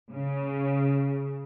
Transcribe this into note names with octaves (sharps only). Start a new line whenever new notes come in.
C#3